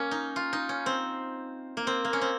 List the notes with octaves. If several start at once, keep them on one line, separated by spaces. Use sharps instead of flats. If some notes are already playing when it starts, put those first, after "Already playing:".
Already playing: A#3 C#4
D#4
F4
D#4
C#4
C4
A#3
C4
A#3
C#4
C4